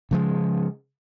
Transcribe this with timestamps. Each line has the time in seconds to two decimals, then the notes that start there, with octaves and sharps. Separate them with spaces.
0.11 C#3 F3 G#3